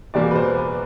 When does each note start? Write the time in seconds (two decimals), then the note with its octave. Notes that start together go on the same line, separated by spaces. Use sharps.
0.14 E2 B2 G3 A#3 D5
0.31 B4
0.35 C5
0.58 B4